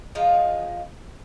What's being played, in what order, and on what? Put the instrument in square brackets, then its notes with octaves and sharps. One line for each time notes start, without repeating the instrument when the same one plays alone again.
[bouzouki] F3 G#3 D#4 F4